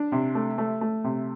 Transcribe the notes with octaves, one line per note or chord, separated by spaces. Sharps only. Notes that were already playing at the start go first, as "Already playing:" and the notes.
Already playing: D4
C3
A3
A3
A3
C3